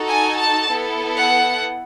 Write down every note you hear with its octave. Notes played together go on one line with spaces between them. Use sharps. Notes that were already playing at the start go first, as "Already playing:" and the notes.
Already playing: D#4 F#4 A4
G#5
A5
B3 E4 A4
F#5